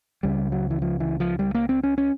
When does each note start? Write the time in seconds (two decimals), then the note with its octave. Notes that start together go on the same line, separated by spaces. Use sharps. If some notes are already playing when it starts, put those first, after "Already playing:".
0.23 C#2 C#3 G3
0.52 F#3
0.71 E3
0.82 F3
1.00 E3
1.20 F3
1.39 G3
1.55 A#3
1.69 C4
1.83 C#4
1.98 C#4